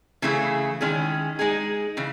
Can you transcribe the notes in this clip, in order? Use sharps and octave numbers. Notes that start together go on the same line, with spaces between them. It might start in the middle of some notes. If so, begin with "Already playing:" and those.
C#3 E3 A3 E4 G#4
D#3 G#3 C#4 E4 G#4
G#3 D#4 G#4
C#3 E3